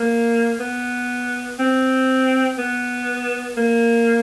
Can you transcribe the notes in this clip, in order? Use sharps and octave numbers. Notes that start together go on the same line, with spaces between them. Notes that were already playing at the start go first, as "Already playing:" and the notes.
Already playing: A#3
B3
C4
B3
A#3